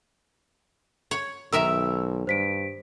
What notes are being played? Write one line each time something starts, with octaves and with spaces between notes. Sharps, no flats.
C#5
B1 D#3 A#4 E5 E6
G2 C5 B6 D7